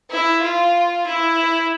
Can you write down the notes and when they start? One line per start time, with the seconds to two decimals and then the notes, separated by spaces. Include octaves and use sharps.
0.11 E4
0.42 F4
1.06 E4